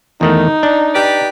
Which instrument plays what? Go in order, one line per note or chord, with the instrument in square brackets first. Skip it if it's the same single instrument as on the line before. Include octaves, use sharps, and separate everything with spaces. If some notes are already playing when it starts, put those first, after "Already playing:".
[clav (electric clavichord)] E2 D#3 A3 [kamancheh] D#4
[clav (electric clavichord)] D4
[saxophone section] G4 B4 D5